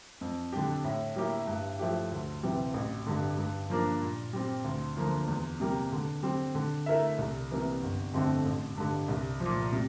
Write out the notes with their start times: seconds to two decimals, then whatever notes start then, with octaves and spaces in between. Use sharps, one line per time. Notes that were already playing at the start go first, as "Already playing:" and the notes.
0.21 F2
0.53 D3 G3 D4 G4
0.84 A2
1.16 G3 A#3 E4 G4
1.47 G2
1.79 F3 A3 E4 G4
2.12 D2
2.43 C3 E3 G3
2.74 A1
3.06 G2 D3
3.38 G2
3.70 F3 A#3 D4
4.02 A#2
4.33 G3 C4
4.65 D2
4.97 D3 F3 A#3 F4
5.28 E2
5.60 C3 G3 A#3
5.92 D3
6.23 G3 C4
6.55 D3
6.86 A3 E4 A#4 E5
7.18 C2
7.51 C3 E3 A#3
7.82 G1
8.13 F2 D3 A3 C4
8.46 A1
8.77 G2 D3
9.08 C2
9.40 F3
9.46 A#2
9.72 C3